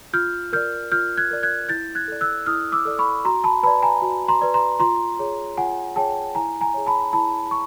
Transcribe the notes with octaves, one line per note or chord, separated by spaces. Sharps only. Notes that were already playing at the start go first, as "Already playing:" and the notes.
F4 F6 G6
A#4 D5 F6 G6
F4 F6 G6
F#6 G#6
A#4 D5
F#6 G#6
E4 G6 A6
F#6 G#6
A4 D5
E6 F#6
E4 D#6 F6
D6 E6
A4 D5
B5 C#6
F#4 A#5 C6
A5 B5
B4 D5 A5 B5
G#5 A#5
F#4
A#5 C6
B4 D5
A#5 C6
F4 A#5 C6
G#4 C#5
F4 F#5 G#5
G#4 C#5 G5 A5
E4 G#5 A#5
G#5 A#5
G#4 C#5
A5 B5
E4 A5 B5
C#6